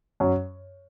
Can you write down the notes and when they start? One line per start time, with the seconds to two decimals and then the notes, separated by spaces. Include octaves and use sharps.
0.20 F#2 F#3